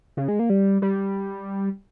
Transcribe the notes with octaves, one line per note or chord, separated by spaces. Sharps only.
C#3
G#3
A#3
G3
G3